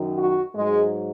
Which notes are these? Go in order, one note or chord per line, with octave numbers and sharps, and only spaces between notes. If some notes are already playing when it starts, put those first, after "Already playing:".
Already playing: F#2 D#3 F#3
F#4
G#2 F#3 G#3